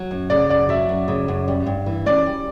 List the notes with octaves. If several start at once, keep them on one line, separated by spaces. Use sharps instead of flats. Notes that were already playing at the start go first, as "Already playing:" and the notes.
Already playing: F#3
F#2
C#3 D5
F#2 D5
F#3 E5
F#2
C#3
F#2
G3
G2
E3
C#4 D5
G3